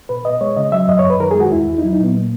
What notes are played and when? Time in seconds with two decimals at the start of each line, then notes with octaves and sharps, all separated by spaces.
0.09 B2 B4
0.25 B2 D#5
0.41 G#3 C#5
0.57 C#3 D#5
0.72 F#3 E5
0.88 F#2 D#5
0.99 C#5
1.04 F#2
1.10 B4
1.20 D#3 A#4
1.31 G#3 G#4
1.40 F#4
1.51 E2 E4
1.67 E2
1.78 D#4
1.82 F#3 E4
1.93 D#4
1.99 A#2 B3
2.14 A#2 A#3